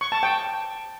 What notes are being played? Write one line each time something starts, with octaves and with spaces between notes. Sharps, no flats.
C#6
A5
G5